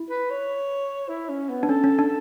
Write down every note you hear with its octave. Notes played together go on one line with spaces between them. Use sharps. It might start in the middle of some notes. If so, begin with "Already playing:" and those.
Already playing: E4
B4
C#5
E4
C#4
B3
D4
C#4 A4
C#4
D4